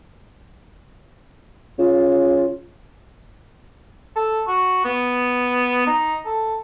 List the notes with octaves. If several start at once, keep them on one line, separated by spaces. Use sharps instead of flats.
C#3 F4
A4
F#4
B3
D#4
A4